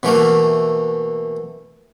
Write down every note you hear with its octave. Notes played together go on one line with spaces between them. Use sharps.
B2 E3 A3 A#3